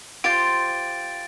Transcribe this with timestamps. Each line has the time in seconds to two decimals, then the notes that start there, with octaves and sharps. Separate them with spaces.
0.24 F4 G4 C5 A6 D7